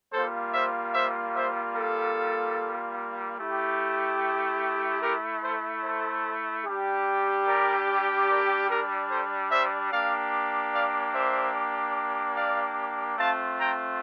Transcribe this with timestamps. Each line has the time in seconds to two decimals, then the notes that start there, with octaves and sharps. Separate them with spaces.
0.13 G3 A#3 F4 A4 C5
0.53 C5 E5
0.94 C5 E5
1.35 C5 E5
1.76 A4
3.39 A3 E4 G4
5.02 G4 A#4
5.42 A4 C5
5.84 A4 C5
6.66 G3 D4 G4
7.46 A#4 D5
8.29 A#4 D5
8.69 G4 A#4
9.10 A4 C5
9.51 C5 E5
9.91 A#3 D4 G4 D5 F5
10.73 D5 F5
11.14 C5 E5
12.36 D5 F5
13.18 A3 C4 F4 F5 A5
13.59 G5 A#5